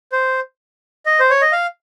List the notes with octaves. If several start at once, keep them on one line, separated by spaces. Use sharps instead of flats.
C5
D#5
C5
C#5
D#5
F5